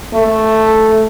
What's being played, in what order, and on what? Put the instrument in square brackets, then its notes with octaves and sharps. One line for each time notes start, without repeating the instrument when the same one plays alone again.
[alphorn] A3